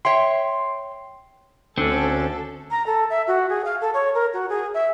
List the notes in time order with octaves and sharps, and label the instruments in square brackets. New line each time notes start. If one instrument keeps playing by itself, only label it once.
[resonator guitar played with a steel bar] C#5 E5 G5 [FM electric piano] C6
[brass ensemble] D2 [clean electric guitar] D3 [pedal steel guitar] C4 C#4 [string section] A4
[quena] A#5
A4
E5
F#4
G#4
F5
A4
C#5
A#4
F#4
G#4
E5